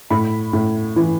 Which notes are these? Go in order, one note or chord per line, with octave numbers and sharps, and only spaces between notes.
A2 B5
A2
E3